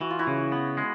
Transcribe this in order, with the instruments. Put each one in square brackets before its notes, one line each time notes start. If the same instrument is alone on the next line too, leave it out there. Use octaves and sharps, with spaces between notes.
[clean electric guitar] E3 [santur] F#4
[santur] F4
E4 F#4
[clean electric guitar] C#3
B3
G#3